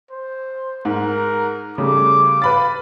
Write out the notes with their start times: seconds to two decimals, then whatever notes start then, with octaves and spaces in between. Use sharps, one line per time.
0.11 C5
0.85 G#2 A#4
1.78 C#3 G3 A3 D6
2.42 B4 F5 B5 A6